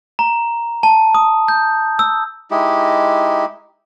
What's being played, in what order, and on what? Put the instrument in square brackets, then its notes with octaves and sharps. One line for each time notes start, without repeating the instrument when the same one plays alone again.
[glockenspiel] A#5
A5
D#6
G6
E6
[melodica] G#3 D#4 E4 G4